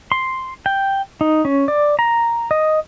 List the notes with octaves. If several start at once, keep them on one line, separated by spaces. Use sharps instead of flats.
C6
G5
D#4
C#4
D5
A#5
D#5